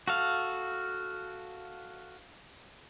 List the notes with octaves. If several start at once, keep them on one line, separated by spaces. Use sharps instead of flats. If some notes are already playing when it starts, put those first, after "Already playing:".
F#4 A4 F5